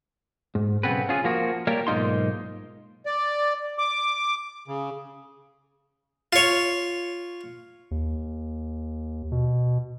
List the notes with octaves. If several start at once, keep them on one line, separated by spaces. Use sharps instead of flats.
G#2
B1 C#3 B3 C4 B4
C#4 F4 G#4
F3 A#3 F#4
G3 A#3 A#4 C#5 D5
B1 G#2 A#3 D#4 F4 C6
D5
D6
C#3
F4 C#5
D#2
B2